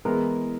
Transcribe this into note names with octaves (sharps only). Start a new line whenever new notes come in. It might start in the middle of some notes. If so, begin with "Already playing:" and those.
E3 G#3 B3 E4 A#4